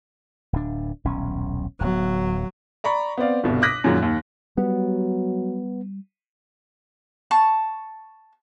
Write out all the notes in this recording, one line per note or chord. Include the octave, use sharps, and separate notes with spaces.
D1 D4
D#1 B1 C#4
D1 F#3 B3
D5 A#5 B5 C#6
B3 C4 D5 F5
G1 C2 B2
D6 D#6 F#6 A#6 B6
F#2 A#2 D#3 F#3 G#3
D#2
F#3 G3 B3
A5 C#6